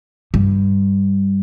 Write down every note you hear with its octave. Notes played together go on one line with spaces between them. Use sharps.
G2